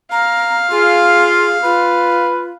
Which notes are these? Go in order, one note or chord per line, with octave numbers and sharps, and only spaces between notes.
F5 A#5
F4 G#4
F4 B4